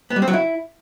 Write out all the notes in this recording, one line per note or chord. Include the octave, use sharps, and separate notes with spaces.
B3
G3
C4
F#3
E4